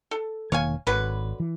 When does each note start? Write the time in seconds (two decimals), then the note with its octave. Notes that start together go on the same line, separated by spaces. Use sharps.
0.11 A4
0.52 E1 D#3 A#3 C#5 F5 G#5
0.87 G#1 D3 F#3 B4
1.40 E3